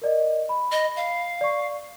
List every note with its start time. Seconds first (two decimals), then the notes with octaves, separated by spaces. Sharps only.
0.02 A#4 D5 D#5
0.49 B5
0.72 D#5
0.96 F5
1.41 D5 C#6